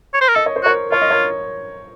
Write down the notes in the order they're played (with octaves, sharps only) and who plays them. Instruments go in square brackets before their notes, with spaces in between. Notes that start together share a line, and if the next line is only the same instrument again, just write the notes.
[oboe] C#5
C5
A#4
[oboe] A4 [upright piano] D#5
[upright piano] C#5
C5
[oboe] F#4 [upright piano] A#4 C#5
[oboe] F4 [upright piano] C#5
[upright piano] D#5
A#4 C#5